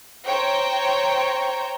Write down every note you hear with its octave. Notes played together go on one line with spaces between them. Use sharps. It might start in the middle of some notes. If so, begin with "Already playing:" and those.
C5 C#5 G5 A#5